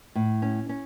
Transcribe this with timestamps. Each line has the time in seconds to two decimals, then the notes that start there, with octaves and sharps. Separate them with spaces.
0.15 A2
0.42 C#4
0.69 C#4